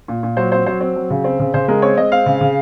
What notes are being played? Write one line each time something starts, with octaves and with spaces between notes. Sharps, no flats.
A#2
A#2
F#3 C5
C4 C5
F#3 C5
C4
F#3
C#3
C4
C#3
C#3 C5
G#3 A#4
C4 C#5
G#3 D#5
C4 F5
C#3
C#3